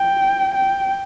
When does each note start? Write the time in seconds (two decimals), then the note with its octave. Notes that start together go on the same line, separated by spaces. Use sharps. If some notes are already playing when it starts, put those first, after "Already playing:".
Already playing: G5
0.55 G5